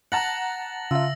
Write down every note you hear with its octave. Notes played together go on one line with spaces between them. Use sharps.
F#5 A5 A#5 A6 A#6 F#7
C#3 F4 E5 E6